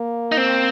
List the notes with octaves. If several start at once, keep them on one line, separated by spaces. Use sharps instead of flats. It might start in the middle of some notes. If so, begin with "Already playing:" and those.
Already playing: A#3
D#4
C4